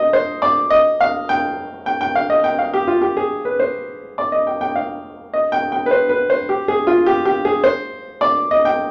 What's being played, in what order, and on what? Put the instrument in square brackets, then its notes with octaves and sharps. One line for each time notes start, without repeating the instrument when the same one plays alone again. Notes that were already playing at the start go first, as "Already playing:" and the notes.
Already playing: [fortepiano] D#5
C5
D5
D#5
F5
G5
G5
G5
F5
D#5
G5
F5
G4
F4
G4
G#4
B4
C5
D5
D#5
G5
G5
F5
D#5
G5
G5
B4
C5
B4
C5
G4
G#4
F4
G4
G4
G#4
C5
D5
D#5
G5